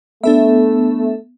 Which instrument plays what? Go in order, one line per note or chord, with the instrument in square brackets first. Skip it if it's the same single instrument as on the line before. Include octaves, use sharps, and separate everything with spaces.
[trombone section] A3 [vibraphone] B3 [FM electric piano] D4 A4 E5